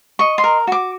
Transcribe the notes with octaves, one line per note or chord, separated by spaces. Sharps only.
D#5 C#6
C6
A#4
F#4 D6